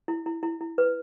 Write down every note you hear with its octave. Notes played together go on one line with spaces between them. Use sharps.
E4
E4
E4
E4
B4